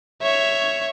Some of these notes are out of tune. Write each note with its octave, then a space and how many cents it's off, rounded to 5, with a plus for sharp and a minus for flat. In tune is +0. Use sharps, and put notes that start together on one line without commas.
C#5 +0 E5 +0